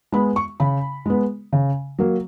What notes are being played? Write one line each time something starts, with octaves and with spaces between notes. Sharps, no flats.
G#3 B3 B5
C#6
C#3 B5
G#3 B3
C#3
F#3 A#3